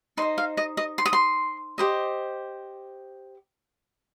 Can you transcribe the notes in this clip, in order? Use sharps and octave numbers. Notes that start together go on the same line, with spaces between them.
D#4 C5 D#5 C6
F5
D#5
D#5
C6
D#6
C6
G4 C5 D#5